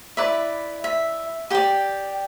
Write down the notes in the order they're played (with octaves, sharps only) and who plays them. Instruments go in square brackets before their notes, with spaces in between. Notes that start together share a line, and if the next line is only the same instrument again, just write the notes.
[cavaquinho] E4 B4 D5 E5
E5
G4 D5 G5